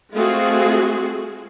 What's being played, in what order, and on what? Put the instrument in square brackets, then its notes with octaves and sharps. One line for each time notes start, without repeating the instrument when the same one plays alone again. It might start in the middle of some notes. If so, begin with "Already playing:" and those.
[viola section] G#3 A3 C4 F4 F#4 G#4